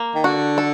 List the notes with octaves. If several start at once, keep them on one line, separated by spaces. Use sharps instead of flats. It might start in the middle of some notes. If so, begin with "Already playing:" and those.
Already playing: A#3
D#3
D3 F#4
A4